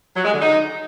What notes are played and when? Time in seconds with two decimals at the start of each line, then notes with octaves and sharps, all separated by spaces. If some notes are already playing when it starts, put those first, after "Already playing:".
0.16 F#3
0.25 G#3
0.33 D3
0.41 D#4